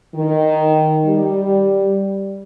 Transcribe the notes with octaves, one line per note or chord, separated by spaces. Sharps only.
D#3
G3